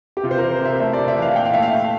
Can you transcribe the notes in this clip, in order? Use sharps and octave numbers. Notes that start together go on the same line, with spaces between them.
G4
C3 F4
C5
E3 A#4
C5
C3 E5
A3 E5
D5
C3
E5
E3
F5
A#2 G5
F5
A3 E5
F5
A3